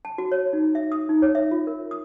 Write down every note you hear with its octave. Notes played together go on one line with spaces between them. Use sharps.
A5
F#4
C#5
D#4
E5
D#6
D#4
C#5
E5
F4
A#4
D#6